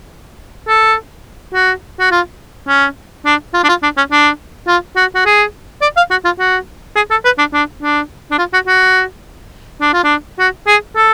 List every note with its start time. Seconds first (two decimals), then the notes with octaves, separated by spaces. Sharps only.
0.68 A4
1.54 F#4
2.00 F#4
2.12 F4
2.68 C#4
3.26 D4
3.54 F4
3.64 D4
3.69 F4
3.83 D4
3.97 C#4
4.11 D4
4.67 F4
4.96 F#4
5.15 F#4
5.26 G#4
5.82 D5
5.97 F5
6.11 F#4
6.25 F4
6.39 F#4
6.96 G#4
7.11 A4
7.25 B4
7.39 D4
7.53 D4
7.83 D4
8.31 D4
8.38 F4
8.53 F#4
8.68 F#4
9.81 D4
9.93 F4
10.04 D4
10.39 F#4
10.67 G#4
10.97 A4